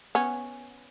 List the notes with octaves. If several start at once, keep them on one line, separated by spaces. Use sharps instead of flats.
B3 C#4